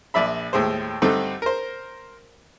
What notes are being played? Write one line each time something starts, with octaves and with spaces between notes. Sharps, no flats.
A#1 D5 E5 B5
D#2 A2 G#3 C5
G2 D3 A3 C4 D#4
A#4 C5